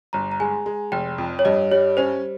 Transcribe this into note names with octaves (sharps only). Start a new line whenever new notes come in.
G1 A#5
A#5
G#3 G#5
G#3
F1 G5
F2
C#5
G2 D#5
G3 C#5
C#4 C5